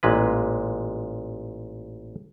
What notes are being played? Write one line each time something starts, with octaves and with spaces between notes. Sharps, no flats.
A1 A#2 G#3 B4